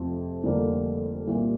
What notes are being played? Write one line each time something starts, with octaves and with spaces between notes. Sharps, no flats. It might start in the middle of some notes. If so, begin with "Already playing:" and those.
Already playing: F1 F2 C3 F3 C4
F1 F2 D3 G3 A#3
C2 A#2 A#3